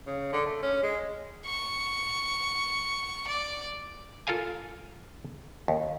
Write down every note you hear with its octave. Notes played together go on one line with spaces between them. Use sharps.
C#3
D3
A3
C#4
G#3
C#6
D5
F4 A4 A#4 F5 G#5
D#2